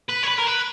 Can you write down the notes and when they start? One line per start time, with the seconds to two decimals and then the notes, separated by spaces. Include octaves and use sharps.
0.09 B4
0.23 C#5
0.28 B4
0.39 A#4
0.47 B4